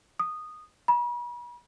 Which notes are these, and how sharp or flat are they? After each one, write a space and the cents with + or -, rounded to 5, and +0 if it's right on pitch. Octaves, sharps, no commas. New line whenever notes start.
D#6 -10
B5 -40